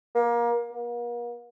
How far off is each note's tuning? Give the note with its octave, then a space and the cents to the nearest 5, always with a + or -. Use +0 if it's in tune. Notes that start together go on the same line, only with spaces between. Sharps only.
A#3 +25
A#3 +45